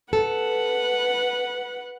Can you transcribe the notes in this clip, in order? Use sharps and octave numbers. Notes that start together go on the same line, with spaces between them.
A4 B4 F#5